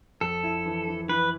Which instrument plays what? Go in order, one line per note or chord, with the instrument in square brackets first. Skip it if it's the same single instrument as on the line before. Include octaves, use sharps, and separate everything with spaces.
[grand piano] F2 [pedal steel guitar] A4
[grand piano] E4
E3
E3
[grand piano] E3 [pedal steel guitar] B4